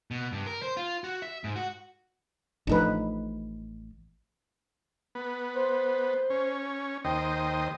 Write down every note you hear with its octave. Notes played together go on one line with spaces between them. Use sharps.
B2
G2
A#4
C5
F4
F#4
E5
G#2
F#4
A1 A2 F3 D4 D#4 B4
B3
C5
C#4
D#2 C5 D#5 G5